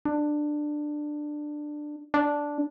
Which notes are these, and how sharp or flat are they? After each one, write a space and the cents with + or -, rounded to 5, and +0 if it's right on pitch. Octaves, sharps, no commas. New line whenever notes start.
D4 +15
D4 -5